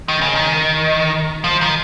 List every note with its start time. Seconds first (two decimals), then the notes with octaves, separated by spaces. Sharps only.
0.08 D#3
0.21 C#3
0.35 D#3
1.44 F3
1.61 D#3